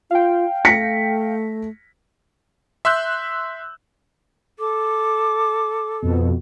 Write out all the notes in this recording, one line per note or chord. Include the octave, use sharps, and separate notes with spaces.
F4 F5 G5
A3 A#6 B6 C#7
E5 C6 E6 F#6 G6
A4 D6
F2 B2